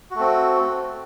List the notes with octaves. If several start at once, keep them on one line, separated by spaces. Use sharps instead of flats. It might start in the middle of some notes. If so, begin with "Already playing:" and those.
A3 C4 F#4